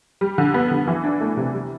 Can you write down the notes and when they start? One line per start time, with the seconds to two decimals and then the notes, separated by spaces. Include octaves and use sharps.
0.21 G3
0.38 D3
0.54 B3
0.71 D3
0.87 E3
1.04 D4
1.21 A3
1.37 C3
1.54 G3